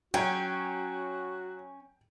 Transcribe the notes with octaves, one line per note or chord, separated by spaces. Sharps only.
F#3 C#4 F#4 G5